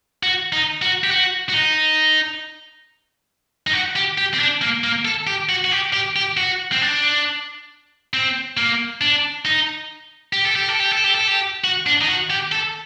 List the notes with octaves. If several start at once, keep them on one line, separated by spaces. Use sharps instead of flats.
F#4
D#4
F#4
G4
F#4
F#4
D#4
D#4
F#4
G4
G4
C4
D4
A#3
A#3
A4
G4
F#4
F#4
G4
G4
G4
F#4
C4
D4
C4
A#3
D4
D#4
G4
A4
G4
A4
G4
A4
G4
A4
G4
F#4
D4
D#4
F#4
G4
A4